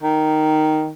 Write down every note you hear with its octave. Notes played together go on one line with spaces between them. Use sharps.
D#3